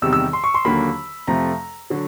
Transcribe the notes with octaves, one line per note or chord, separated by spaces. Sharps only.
E2 C3 D#3 G3 E6
E6
C6
C#6
C6
D#2 D3 F#3 A#3 B5
F2 C3 F3 A3 A#5
D3 F#3